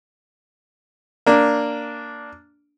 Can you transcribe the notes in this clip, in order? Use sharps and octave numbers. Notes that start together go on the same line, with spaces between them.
A#3 D4